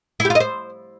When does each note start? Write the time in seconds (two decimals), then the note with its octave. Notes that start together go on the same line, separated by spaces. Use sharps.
0.20 E4
0.25 G4
0.30 F4
0.35 D#5
0.40 C5